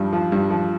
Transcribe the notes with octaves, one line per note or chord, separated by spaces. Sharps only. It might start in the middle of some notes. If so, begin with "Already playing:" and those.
Already playing: G2 F3
F3
G2
F3